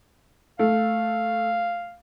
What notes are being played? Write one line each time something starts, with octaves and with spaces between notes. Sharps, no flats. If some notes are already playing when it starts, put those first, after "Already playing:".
A3 F5